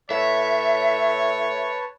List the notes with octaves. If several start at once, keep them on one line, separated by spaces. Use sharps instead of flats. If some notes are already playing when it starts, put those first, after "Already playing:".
A2 B4 C#5 E5 A5